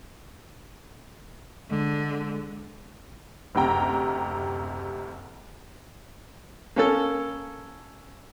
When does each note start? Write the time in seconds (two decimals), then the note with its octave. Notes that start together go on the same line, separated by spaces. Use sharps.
1.70 D3 G#3
3.55 F#1 D2 C3 G5 A#5
6.76 A#3 C#4 A4